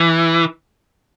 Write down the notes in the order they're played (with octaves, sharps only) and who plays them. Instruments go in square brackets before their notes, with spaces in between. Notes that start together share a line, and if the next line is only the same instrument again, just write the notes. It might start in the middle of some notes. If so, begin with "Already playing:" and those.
Already playing: [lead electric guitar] E3